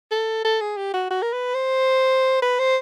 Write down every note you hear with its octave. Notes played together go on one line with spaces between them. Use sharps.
A4
A4
G#4
G4
F#4
F#4
A#4
B4
C5
B4
C5